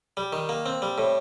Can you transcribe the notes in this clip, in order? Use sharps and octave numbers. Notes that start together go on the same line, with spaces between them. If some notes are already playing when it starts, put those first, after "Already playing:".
G3
D#3
A#3
C4
G3
A2